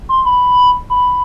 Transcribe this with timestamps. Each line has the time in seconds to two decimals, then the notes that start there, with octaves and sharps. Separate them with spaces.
0.09 C6
0.25 B5
0.90 B5